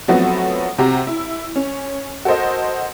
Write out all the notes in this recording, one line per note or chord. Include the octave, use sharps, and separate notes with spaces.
F3 F#3 A3 B3 C4 F#4
C3 C4 F#4 G4 A#5
E4
C#4
F#4 A4 A#4 C5 D#5